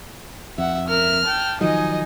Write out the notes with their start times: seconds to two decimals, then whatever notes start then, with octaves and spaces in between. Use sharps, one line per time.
0.58 F2 E5 F#5
0.88 A#4 E5 F6
1.25 G5 A5
1.61 D#3 F3 F#3 D#4 D#5 G#5